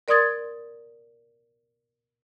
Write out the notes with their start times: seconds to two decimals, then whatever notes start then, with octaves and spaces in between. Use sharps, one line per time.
0.08 A#4 D5 C6 D#6 G#6 A6